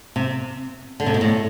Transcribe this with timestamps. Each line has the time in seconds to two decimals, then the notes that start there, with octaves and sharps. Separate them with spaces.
0.16 C3
1.00 D3
1.06 C3
1.14 B2
1.21 A2